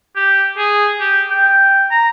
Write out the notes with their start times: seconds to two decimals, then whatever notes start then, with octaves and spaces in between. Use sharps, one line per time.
0.16 G4
0.58 G#4
1.00 G4
1.31 G5
1.91 A#5